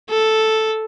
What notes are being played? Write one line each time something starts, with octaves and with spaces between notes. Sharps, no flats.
A4